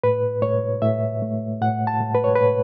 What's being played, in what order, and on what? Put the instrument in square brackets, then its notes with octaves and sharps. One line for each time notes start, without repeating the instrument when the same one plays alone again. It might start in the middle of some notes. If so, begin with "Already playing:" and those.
[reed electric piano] A2 B4
A2 C#5
A2 E5
A3
A2 F#5
A5
A2
B4
C#5
B4
A2